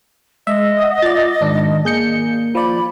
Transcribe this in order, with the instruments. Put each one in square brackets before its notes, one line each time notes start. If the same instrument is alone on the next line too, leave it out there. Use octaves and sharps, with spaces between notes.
[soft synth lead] G#3 [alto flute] D#5 [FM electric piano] E5
[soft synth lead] F#5
[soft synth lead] F4 [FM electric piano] D5 A6
[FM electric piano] G#2 D4 [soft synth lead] D#3
[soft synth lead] A#3 [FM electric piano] G#4 G6 C#7
[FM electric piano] F3 D5 [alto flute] B5